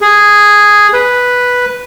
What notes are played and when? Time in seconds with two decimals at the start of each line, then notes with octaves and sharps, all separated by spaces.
0.01 G#4
0.93 B4